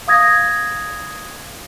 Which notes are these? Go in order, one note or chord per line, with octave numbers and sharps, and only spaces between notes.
F5 D#6 G#6 A#6